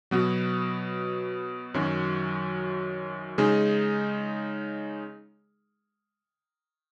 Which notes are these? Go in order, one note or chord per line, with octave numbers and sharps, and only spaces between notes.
B2 F#3 B3 F#4
F#2 D#3 F#3 C#4 F#4
C#3 G#3 D#4 G#4